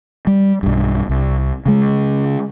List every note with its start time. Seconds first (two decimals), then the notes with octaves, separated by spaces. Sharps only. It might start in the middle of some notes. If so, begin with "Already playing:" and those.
0.27 G3
0.63 B1 G2
1.09 C2
1.66 C#3 G#3